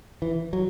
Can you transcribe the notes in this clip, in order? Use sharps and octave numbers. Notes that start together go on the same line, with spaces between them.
E3
F#3